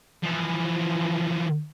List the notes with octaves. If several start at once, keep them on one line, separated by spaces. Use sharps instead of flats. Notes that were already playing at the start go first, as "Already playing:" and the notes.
E3 F3